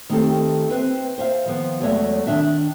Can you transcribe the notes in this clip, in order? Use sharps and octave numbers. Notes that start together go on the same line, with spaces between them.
D#3 A3 C4 D#4 G4 A4
C4 B4 E5
C5 E5 F5
D#3 F3 B3
E2 F#3 G#3 A3 C#5 E5
D#3 D4 E5